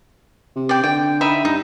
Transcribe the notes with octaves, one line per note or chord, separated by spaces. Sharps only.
C3
D5 G5
D3 G5
D#4 E5 B5
G2 D#4